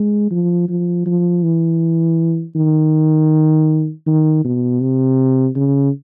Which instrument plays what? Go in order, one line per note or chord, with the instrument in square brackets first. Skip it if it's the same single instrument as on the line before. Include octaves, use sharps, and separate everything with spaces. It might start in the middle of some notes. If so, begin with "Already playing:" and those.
Already playing: [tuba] G#3
F3
F3
F3
E3
D#3
D#3
B2
C3
C#3